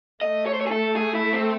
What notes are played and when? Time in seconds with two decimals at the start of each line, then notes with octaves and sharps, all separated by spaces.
0.21 A3 D#5
0.46 C#5
0.54 C5
0.61 C#5
0.67 G#4
0.71 A4
0.96 G#4
1.15 E4
1.33 C4